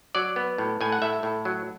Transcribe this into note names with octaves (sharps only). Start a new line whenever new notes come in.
F#3 D5
B3
A2
A2 G#5
F#5
A2 E5
A2
F#3